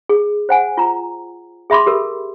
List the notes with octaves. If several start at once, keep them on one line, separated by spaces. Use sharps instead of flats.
G#4
C5 F#5 G#5
F4 A#5
G#4 E5 B5 C6 D6
G4 A4 A#4